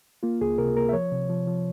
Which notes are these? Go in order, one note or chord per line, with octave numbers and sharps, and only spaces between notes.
A#3 F4
C#2 G#4
C3 A#4
A#3 A#4
E5
F3 C#5
C3
F3
F3